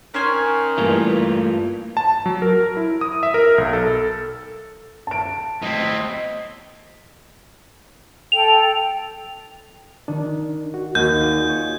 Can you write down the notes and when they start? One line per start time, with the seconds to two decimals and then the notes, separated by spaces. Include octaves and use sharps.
0.14 D#3 C#4 C5 G#5
0.78 G2 E3 A3 A#3 F4
1.97 A5
2.26 F#3
2.42 A#4
2.77 E4
3.01 D#6
3.23 E5
3.34 A#4
3.58 B1
3.73 A4
5.07 A5 D7
5.63 A2 C4 E4 D#5
8.32 A4 G5 F7
10.08 D#3 D4
10.74 F#4
10.95 D#2 A#3 F#4 D#5 G6
11.21 F4 G#4 D5
11.49 C#5